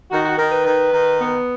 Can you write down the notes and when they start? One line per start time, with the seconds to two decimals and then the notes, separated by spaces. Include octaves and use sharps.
0.11 D#3 F#4
0.24 F#4
0.38 D#3 A#4
0.52 B4
0.65 D#3
0.92 D#3
1.19 B3